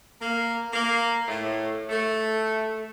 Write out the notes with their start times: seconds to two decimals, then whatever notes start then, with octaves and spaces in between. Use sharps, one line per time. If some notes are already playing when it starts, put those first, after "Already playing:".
0.21 A#3
0.73 A#3
1.28 A2
1.90 A3